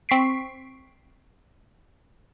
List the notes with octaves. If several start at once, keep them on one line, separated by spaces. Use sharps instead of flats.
C4 C#6 B6 C7 D7